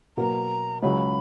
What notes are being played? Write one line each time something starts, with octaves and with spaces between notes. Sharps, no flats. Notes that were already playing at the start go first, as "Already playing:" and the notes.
B2 F#3 A#3 A#5
C#2 C#3 F#3 B5